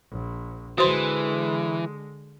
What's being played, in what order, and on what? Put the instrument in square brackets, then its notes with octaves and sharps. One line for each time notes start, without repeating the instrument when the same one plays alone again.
[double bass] A#1
[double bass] D3 G#3 [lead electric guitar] E3 [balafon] F#4 C5 C6